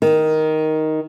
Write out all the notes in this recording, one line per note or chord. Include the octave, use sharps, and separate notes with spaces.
D#3